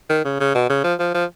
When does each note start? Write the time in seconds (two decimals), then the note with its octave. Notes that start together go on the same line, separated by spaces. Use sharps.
0.10 D#3
0.25 C#3
0.40 C#3
0.55 B2
0.70 C#3
0.84 F3
0.99 F3
1.14 F3